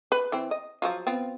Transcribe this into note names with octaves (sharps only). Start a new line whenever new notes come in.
B4
E3 C4
D#5
F3 F#3 F4
B3 C4 F4